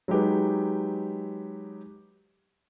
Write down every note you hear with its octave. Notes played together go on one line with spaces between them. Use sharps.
F#3 G#3 D#4 G4 B4